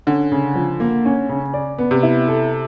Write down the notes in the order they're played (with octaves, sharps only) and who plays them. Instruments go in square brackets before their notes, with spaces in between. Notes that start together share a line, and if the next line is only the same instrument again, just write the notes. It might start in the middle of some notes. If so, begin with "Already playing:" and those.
[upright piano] D3 [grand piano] C#4
[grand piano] C#3
F3
A#3
C#4
C#3
D5
B3
[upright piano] C3
[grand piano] E4
A4